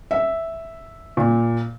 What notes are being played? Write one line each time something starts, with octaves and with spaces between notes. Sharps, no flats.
E5
A#2